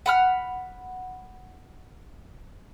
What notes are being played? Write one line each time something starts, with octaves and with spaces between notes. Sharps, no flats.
F#5 B5 F6